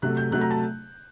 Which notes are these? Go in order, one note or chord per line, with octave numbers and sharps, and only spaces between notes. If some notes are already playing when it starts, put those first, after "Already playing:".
C3 F#3 A3 F#6
G6
C3 F#3 A3 F#6
A#5
A5